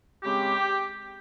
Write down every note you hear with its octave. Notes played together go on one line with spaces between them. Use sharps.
C#3 G#3 C4 G4